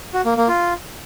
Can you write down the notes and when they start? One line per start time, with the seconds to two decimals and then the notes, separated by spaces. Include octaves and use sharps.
0.14 F#4
0.25 A#3
0.37 A#3
0.48 F4